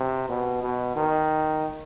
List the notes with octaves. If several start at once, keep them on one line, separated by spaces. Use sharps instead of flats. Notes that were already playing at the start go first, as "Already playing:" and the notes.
Already playing: C3
B2
B2
D#3